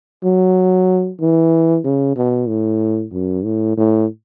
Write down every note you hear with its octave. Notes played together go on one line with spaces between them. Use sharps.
F#3
E3
C#3
B2
A2
F#2
A2
A2